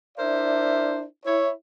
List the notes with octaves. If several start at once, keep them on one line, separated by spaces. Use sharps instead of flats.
D4 E4 A#4 C5 D5 E5
E4 C#5